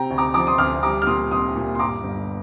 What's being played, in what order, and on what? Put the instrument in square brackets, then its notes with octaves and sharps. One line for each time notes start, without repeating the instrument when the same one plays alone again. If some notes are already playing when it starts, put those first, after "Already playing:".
Already playing: [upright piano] C3 G5 A#5
D2
A#5 D6
F3 A#5 D6
C6 D#6
D2 D6 F6
G3 A#5 D6
F6
A#2 C6 D#6
C2 C6 D#6
A#2
C6
G2 A#5 D6
G1